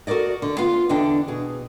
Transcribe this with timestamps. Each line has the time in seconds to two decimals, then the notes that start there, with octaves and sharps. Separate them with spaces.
0.07 F#4 A4 A#4 D5 D#5
0.42 D3
0.58 B3 F4 F5
0.89 E2 D3 D4 D#5 G5
1.28 B2 G#4